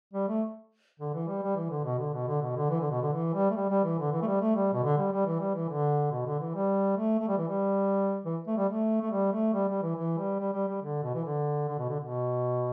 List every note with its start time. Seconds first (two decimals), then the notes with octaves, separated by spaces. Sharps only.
0.14 G3
0.28 A3
1.00 D3
1.14 E3
1.28 G3
1.43 G3
1.57 E3
1.70 D3
1.85 B2
1.99 D3
2.14 B2
2.28 D3
2.42 B2
2.56 D3
2.70 E3
2.81 D3
2.91 B2
3.02 D3
3.13 E3
3.34 G3
3.50 A3
3.56 G3
3.69 G3
3.84 E3
3.99 D3
4.12 E3
4.22 A3
4.27 G3
4.41 A3
4.55 G3
4.73 B2
4.83 D3
4.98 G3
5.12 G3
5.27 E3
5.40 G3
5.55 E3
5.69 D3
6.12 B2
6.26 D3
6.40 E3
6.55 G3
6.98 A3
7.19 A3
7.28 G3
7.38 E3
7.48 G3
8.26 E3
8.47 A3
8.58 G3
8.69 A3
9.01 A3
9.11 G3
9.32 A3
9.54 G3
9.69 G3
9.82 E3
9.96 E3
10.18 G3
10.40 G3
10.53 G3
10.68 G3
10.82 D3
11.03 B2
11.15 E3
11.25 D3
11.68 D3
11.78 B2
11.89 D3
12.00 B2